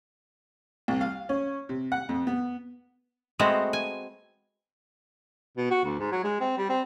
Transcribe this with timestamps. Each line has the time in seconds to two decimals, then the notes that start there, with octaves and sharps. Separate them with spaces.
0.88 C2
1.01 F5
1.29 C#4
1.69 C3
1.92 F#5
2.09 F2
2.27 B3
3.39 G#3 A3 B3 C4 F#4 C5
3.73 G#5
5.57 B2
5.71 F#4
5.84 D2
5.99 G#2
6.12 F#3
6.24 G#3
6.41 C4
6.58 G3
6.69 C4